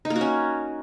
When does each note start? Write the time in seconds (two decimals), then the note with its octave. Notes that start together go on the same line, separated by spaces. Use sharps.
0.05 D#4
0.10 A#3
0.16 F#4
0.21 C#4